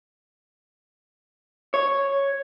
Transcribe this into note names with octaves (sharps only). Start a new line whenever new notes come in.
C#5